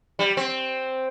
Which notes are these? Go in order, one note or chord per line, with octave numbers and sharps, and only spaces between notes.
G3
C4